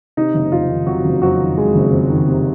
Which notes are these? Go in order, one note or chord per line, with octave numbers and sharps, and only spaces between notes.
C3 D#4
F#1
F2 F4
D#3
C3 F#3 F#4
F#1
F2 F#3 F#4
D#3
C3 G#3 G#4
F#1
F2
D#3
C3